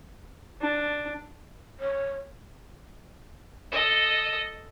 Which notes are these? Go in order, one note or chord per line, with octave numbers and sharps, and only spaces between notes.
D4
C#5
A4 D#5